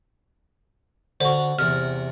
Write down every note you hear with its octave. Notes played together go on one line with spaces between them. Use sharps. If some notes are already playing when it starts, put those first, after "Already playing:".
D3 F#4 C5
E2 C3 F6